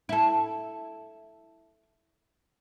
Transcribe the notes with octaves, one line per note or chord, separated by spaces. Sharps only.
E4 A4